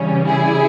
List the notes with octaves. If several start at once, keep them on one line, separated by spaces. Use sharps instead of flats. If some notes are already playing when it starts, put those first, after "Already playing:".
Already playing: C#3 E3 G3 C#4
E4 G#4